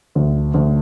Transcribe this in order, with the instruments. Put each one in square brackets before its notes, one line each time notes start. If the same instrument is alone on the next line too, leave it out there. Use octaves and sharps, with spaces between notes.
[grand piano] D2
D2